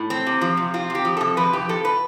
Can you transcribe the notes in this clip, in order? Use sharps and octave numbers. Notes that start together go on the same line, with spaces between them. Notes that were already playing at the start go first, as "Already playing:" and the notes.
Already playing: A2
C4
C3
F3
C3
C4 F4
C3 G4
F3
C3 A4
F3 B4
F2 G4
C3 A4
B4